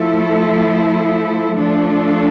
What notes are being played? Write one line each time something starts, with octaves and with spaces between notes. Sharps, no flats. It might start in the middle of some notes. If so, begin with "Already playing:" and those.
Already playing: F3 A3 E4 A4
F3 A3 D4 A4